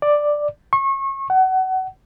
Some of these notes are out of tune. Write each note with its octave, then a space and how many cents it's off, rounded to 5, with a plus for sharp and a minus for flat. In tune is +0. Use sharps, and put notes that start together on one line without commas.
D5 +5
C#6 -30
F#5 +25